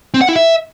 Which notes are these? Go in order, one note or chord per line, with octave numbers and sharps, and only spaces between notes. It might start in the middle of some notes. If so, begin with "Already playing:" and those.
C4
F#5
E4
E5